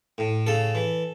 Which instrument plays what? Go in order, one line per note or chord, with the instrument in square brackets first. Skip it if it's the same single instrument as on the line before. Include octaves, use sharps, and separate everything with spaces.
[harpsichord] A2
C#3 A4
E3